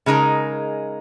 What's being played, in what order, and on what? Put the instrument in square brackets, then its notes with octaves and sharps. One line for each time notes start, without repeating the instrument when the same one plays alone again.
[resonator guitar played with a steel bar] C#3 G#3 D#4 A#4